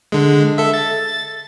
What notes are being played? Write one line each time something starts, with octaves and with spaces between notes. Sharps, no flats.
D3 G#3
A4 E5
A6